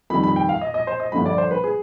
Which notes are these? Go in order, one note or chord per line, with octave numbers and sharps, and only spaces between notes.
F2 D#3 G3 B5
B5
G5
F5
D#5
D#5
C5
D#5
G1 G2 D3 F3 B5
D5
C5
B4
G#4